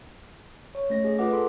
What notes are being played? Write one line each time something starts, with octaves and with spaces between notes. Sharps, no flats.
C#5
A3 C#4 A#6
G#4 D#5
F4 B4 D#5 F#5 D6
A4 C6